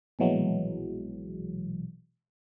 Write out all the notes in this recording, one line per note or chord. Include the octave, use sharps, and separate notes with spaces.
A#1 B2 E3 F#3 G#3